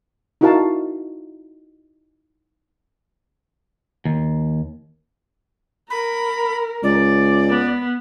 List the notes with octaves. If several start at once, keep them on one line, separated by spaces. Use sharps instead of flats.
D#4 E4 F#4 A#4 F5 A5
D#2
A#4 B5
C#2 D5
B3